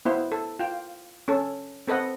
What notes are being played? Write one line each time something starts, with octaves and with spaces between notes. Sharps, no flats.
B3 E4 C5
A4
F4 G5
C#4 A4
C4 A4 B4 D#5 F#5